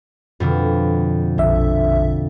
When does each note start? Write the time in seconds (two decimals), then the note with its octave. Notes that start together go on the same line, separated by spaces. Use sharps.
0.40 F2 B2 D3
1.38 A#1 D3 E5